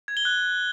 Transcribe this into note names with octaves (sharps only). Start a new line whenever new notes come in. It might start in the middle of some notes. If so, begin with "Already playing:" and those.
G#6
G7
F#6